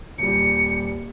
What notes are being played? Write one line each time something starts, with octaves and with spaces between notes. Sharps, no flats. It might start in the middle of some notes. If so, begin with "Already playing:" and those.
D#1 G3 C#7